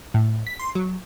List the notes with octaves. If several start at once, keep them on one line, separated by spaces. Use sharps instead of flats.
A2
B6
C6
F#3